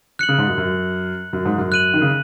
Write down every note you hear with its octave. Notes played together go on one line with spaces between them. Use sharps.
F#6 C#7 F#7
C#3
G#2
F#2
F#2
F#2
G#2
F#2
F#6 D#7 F#7
D#3
C#3